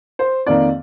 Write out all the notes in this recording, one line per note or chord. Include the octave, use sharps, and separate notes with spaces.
C5
F2 D#3 A#3 D5